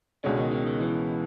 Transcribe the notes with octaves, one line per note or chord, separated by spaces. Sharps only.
C#2 B2 D3 G#3 C#4
D#3
D#3
D#3
E3